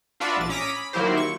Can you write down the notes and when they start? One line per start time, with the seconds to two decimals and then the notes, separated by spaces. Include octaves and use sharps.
0.20 D4 F4 F#4 B4 D5 E5
0.37 A#1 A6
0.49 C#4 A#5 D6 D#6 B6
0.75 B5
0.93 D#3 F#3 A#3 E4 G4 C5
1.17 C#6